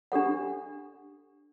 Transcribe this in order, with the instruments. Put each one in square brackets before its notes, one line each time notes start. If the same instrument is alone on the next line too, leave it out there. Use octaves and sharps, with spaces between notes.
[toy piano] D4 G4 A4 F#5